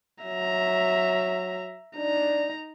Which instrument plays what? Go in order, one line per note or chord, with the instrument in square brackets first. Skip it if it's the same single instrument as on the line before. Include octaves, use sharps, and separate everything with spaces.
[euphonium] F#3 [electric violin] E5 A#5
[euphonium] D4 [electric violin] D#4 A#5